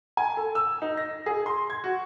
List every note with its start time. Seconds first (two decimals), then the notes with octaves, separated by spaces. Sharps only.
0.17 G#5
0.37 A4
0.55 E6
0.82 D#4
0.97 A#6
1.26 G#4
1.46 C6
1.70 G#6
1.84 F#4